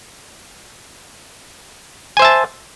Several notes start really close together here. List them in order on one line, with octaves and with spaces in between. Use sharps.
G#5 C5 E5 A5